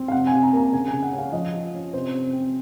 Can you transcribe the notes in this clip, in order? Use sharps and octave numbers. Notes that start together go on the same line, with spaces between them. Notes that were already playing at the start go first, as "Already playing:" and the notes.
Already playing: C4
F5
C3 F#5
G#5
C3
A#5
A#3 A#5
C#3 G#5
G#5
C#3
F#5
C#4
F5
F3 D#5
F4
C#4
C3 C5
C3
C4